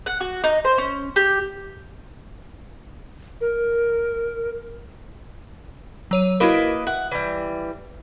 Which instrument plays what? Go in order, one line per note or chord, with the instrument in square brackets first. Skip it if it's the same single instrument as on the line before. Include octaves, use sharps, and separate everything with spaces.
[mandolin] F#5
F#4
D#4
C5
C#4
G4
[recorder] A#4
[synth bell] F#3 C#5 D#7
[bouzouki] A#3 B4 D#5 [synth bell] E4 F#4 A#4
[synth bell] E5 [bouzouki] F#5
[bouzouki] E3 G3